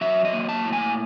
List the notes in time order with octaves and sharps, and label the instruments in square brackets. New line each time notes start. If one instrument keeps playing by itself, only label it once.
[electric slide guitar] F#3 E5
D#5
A#3
A5
A2
G#5